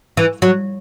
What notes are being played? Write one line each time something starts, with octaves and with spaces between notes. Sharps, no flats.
E3
F#3